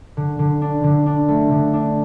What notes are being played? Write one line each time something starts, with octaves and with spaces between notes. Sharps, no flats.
D3
D3
D4
D3
D4
A3
D3
D4